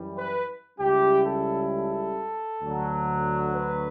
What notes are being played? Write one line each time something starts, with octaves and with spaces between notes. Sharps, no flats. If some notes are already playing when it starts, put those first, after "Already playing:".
Already playing: F#2 E3 G3
B4
C#2 C#3 G3 C#4 E4 G4
A4
A4
D2 D3 F#3
B4